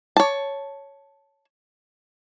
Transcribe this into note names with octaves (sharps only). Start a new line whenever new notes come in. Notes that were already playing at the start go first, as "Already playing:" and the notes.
C#5 A5